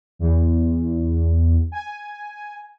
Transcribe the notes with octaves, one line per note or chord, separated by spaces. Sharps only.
E2
G#5